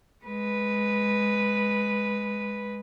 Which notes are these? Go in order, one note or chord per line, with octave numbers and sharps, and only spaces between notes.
G#3 B4